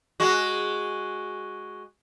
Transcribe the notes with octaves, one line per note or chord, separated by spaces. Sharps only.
G#3 F#4